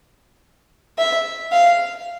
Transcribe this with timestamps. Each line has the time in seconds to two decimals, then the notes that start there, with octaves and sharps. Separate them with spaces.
0.98 E5
1.52 F5